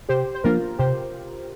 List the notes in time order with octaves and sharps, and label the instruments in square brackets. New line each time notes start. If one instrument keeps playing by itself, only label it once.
[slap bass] C3 [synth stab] G4 C5
[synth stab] C5
[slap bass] F3 A#3 D4 [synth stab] F4 A#4
[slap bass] C3 [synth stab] G4 C5